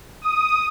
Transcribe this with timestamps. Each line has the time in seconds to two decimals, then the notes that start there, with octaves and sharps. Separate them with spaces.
0.22 D#6